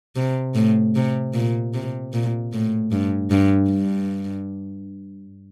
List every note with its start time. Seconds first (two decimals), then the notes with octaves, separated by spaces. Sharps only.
0.16 C3
0.55 A2
0.95 C3
1.34 A#2
1.74 C3
2.13 A#2
2.53 A2
2.92 G2
3.31 G2
3.70 G2